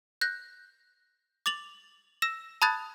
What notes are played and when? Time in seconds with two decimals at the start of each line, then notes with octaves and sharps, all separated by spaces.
0.21 F#6 G6 A#6
1.46 D6 A6 F7 F#7
2.22 E6 A#6 E7
2.62 A5 B5 D#6 F#6 G#6 A6